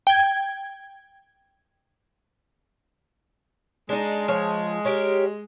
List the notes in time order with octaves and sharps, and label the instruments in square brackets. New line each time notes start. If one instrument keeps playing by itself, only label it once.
[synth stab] G5 G#6
[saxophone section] G#3 [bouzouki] D4 D#4
[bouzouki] F3 C#5
G4 A#4 C#5